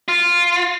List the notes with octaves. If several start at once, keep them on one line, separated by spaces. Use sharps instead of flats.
F4